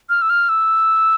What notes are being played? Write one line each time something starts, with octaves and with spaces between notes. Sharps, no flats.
F6
E6
F6
E6